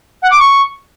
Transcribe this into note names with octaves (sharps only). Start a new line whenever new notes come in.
F#5
D6
C#6